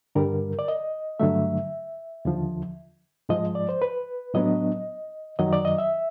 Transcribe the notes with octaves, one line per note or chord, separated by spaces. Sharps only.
G2 D3 G3 A#4
D5
D#5
G2 D3 F#3 A3 E5
D#2 D3 F3
G#2 F3 G#3 D#5
D5
C5
B4
A2 F#3 B3 D4 D#5
F#2 D#3 F#3 D#5
D5
D#5
E5